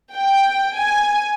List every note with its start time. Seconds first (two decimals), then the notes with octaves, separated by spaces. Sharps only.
0.15 G5
0.75 G#5